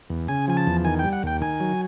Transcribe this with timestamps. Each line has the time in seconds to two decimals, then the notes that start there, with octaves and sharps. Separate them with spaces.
0.10 E2
0.28 C#3 G#5
0.48 F3 G#5
0.57 A5
0.67 E2
0.85 D#3 G#5
0.99 G3 G5
1.13 F#5
1.23 D#2 G5
1.41 D#3 G#5
1.60 F#3